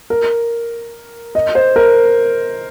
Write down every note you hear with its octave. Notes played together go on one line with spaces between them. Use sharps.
A#4
D#5
C5
A#4